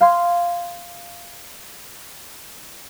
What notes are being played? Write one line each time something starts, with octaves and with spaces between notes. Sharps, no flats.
F5 C6 G#6